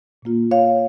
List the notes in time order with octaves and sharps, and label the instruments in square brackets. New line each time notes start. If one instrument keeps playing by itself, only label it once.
[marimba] A#2 A#3 F4
C#5 F5